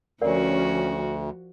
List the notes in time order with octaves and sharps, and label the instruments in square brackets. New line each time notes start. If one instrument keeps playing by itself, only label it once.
[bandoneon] D2 [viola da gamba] F3 F#4 [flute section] C#4 [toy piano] A#4 D5 F#5